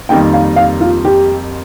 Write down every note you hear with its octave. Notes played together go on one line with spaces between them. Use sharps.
F2 D#3 G3 A#3 D#4 G5
F5
F5
F4
G4